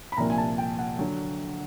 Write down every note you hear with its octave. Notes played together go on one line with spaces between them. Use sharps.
B5
C2 A#2 F3 A#3 D4 A#5
G#5
A5
G5
F#5
D3 F#3